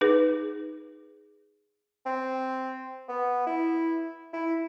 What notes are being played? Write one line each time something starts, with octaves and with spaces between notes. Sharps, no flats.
D#4 G#4 B4
C4
B3
E4
E4